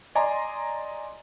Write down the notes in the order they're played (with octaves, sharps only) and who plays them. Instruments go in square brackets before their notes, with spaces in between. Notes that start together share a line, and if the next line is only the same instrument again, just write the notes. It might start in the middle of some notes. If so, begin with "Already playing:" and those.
[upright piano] D5 D#5 G#5 A#5 C6